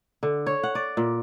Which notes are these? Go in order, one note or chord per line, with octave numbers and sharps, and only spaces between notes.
D3
C#5
F#5
D5
A#2